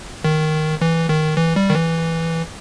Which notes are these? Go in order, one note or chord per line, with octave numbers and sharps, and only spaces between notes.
D#3
E3
D#3
E3
G3
D#3
E3